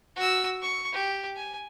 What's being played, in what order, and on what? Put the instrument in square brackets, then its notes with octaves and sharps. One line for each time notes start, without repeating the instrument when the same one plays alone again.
[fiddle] F#4 E6
C#6
G4
G#5